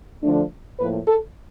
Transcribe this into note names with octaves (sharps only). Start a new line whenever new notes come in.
D3 F3 A3 D4
A2 F3 A#3 B4
A4